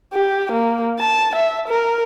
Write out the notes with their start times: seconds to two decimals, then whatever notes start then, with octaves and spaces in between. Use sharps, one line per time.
0.13 G4
0.52 A#3
0.99 A5
1.36 E5
1.68 A#4